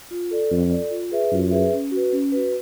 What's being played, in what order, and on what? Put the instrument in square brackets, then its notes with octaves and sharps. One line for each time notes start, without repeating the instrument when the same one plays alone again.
[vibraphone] F4
A4 D5
[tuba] F2 [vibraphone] F4
[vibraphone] A4 D5
F4
G#4 B4 E5
[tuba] F#2 [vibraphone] F4
[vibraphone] G#4 B4 E5
C#4
F#4
B4
C#4
F#4 B4